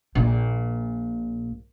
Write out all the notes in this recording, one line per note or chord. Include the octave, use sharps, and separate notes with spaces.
A#1 A#2